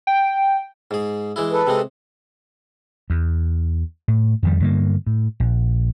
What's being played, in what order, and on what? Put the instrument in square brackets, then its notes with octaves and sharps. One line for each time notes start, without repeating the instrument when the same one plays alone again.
[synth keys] G5
[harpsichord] G#2 G#4
E3 G#3 E4
[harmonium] A4 B4
[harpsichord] C3 G#3 C4
[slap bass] E2
A2
F2 D#3 G3
G2 D3 G3 A#3
A2
A#1